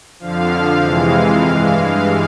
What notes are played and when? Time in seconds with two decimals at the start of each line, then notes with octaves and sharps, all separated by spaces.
0.19 F2 D3 F3 F5
0.81 F2 C3 E3 G#3 F5
1.12 F5
1.44 G2 E3 G#3